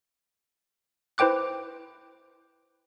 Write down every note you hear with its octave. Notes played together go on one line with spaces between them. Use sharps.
E4 B4 C5 G5 D6 F#6